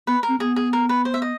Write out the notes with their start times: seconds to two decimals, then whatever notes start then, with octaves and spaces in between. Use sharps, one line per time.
0.07 B3 B4
0.23 A#4
0.29 C4
0.40 B3 G#4
0.56 G#4
0.73 A#4
0.89 B4
1.05 C5
1.14 E5
1.22 D#5